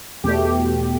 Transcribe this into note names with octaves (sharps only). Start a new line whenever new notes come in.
E2 B2 A3 G4